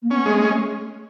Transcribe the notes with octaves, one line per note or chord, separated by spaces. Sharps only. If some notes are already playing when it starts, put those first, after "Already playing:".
A#3
B3 C#4
G#3 A3
A3 C#4